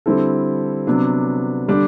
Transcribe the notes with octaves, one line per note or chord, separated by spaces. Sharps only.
D3 G3 C4 E4 A4
C3 F#3 B3 D4
D3 G3 D4